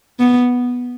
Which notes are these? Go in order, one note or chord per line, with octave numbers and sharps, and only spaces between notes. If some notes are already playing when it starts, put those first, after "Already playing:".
B3